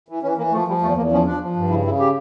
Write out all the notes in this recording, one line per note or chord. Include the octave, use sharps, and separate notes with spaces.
E3
E3 C#4
E3 A#3
F3 A3
F3 G3
E2 A3
E2 A#3
F3 C#4
F3 D4
F3
G2
C#3 E4
C#3 E4
G4